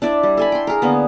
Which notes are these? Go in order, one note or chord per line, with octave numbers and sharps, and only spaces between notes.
D4 E4 D5
G3
A4 G#5 B5
G5 C6
G#4 A#4
D3 A#3 B3